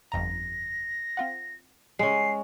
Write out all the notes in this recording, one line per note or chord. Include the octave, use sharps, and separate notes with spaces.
G1 F2 A#5 A#6
C4 F4 F#5
C#3 G#3 C#4 C7